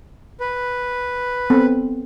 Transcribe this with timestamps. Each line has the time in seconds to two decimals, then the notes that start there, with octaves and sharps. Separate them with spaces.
0.40 B4
1.50 B3 C4 A4